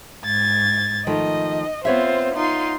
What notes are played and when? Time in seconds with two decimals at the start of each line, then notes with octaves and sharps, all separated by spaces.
0.24 G#2 G#6 A6
1.07 D#3 F3 A3 D#5
1.85 B3 C4 F4 C5 C#5 E5
2.34 D#4 F4 C6